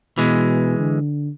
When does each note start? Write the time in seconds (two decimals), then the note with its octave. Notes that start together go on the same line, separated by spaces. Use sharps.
0.18 B2 E3 G#3
0.79 D3